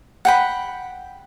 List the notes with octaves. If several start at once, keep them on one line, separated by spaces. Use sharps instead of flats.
F#5 G5 B5